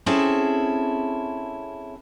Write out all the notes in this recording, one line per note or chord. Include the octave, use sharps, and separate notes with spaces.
C4 C#4 E4 G#4 A4